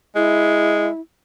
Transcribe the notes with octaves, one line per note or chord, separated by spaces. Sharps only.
G#3 E4